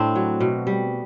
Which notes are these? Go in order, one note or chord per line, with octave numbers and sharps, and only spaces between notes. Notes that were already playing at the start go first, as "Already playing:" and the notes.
Already playing: A2 A3 C4 D4
F#3
B2
G3